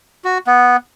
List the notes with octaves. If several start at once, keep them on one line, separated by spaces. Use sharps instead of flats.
F#4
B3